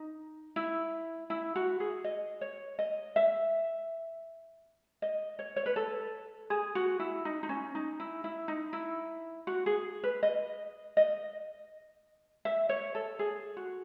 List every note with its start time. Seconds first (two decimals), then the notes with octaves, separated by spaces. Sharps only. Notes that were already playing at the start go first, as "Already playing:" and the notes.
Already playing: D#4
0.56 E4
1.30 E4
1.56 F#4
1.80 G#4
2.04 D#5
2.41 C#5
2.79 D#5
3.16 E5
5.02 D#5
5.39 C#5
5.56 C#5
5.66 B4
5.76 A4
6.50 G#4
6.75 F#4
6.99 E4
7.25 D#4
7.43 D#4
7.49 C#4
7.75 D#4
8.00 E4
8.24 E4
8.48 D#4
8.73 E4
9.47 F#4
9.66 G#4
10.04 B4
10.23 D#5
10.97 D#5
12.45 E5
12.69 C#5
12.95 A4
13.19 G#4
13.57 F#4